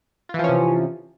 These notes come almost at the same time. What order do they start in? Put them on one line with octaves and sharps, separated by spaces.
F4 E3 F3 C#4 C3